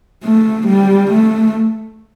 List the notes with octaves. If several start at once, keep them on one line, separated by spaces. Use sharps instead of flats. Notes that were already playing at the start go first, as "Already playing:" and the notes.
A3
G3
A3